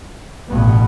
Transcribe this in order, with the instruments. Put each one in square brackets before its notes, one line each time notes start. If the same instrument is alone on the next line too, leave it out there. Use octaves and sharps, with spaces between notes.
[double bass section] A1 G2 B2 B3